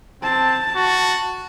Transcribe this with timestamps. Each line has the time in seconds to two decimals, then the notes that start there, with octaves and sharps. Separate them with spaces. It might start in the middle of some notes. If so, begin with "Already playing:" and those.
0.23 C4 A5
0.76 F#4